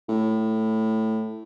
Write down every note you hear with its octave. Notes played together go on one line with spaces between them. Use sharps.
A2